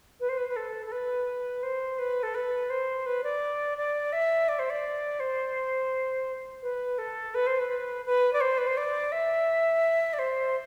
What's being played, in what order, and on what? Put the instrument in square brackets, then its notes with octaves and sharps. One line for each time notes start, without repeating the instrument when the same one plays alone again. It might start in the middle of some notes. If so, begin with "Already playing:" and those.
[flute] B4
C5
B4
B4
A4
A4
B4
C5
B4
A4
B4
C5
B4
D5
D5
E5
D5
C5
D5
C5
B4
A4
B4
C5
B4
B4
D5
C5
B4
C5
D5
E5
D5
C5